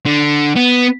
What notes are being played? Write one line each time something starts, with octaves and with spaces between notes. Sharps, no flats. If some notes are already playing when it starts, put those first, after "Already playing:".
D3
B3